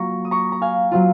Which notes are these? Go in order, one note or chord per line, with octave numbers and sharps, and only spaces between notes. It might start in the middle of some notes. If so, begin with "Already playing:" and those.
Already playing: F#3 A#3 F4 A#5 C#6
D#6
A#5 C#6
A#5
F5 G#5
F#3 C4 F4